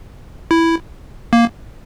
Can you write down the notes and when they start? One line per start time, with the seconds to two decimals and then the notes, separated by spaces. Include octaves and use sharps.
0.51 E4
1.33 A#3